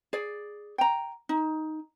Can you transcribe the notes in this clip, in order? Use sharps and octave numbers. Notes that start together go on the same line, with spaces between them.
G#4 D5
G5 A#5
D#4